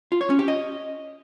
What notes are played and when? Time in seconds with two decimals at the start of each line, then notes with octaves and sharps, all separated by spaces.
0.12 F4
0.21 C#5
0.30 C#4
0.39 G4
0.48 D#5